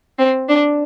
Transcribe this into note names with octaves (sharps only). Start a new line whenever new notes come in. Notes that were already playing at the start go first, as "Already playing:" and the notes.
C4
D4